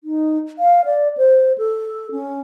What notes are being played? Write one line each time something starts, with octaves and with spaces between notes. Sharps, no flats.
D#4
F5
D5
C5
A4
C#4